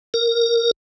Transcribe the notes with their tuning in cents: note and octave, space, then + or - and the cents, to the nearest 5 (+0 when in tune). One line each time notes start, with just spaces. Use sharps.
A#4 -5